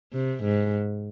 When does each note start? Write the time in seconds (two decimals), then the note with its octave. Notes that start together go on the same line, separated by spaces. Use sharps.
0.13 C3
0.44 G#2